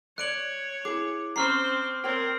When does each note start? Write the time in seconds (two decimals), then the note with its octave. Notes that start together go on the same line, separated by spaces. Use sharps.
0.18 C#5 D5 F#6 D7 F#7
0.85 E4 G#4 D6
1.36 C4 C#4 C5 A#5 C#6 F6 C7
2.04 C4 A#4 C5 C#5 G5